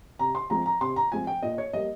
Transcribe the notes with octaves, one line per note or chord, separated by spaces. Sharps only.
C3 A#5
C6
F3 G#3 C4 A#5
A#5
C3 C6
A#5
F3 G#3 C4 G#5
G5
A#2 D#5
C#5
G3 A#3 D#5